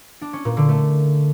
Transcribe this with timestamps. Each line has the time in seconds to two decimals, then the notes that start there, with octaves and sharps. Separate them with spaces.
0.21 D4
0.33 C#4
0.45 A#2
0.57 D3
0.69 A3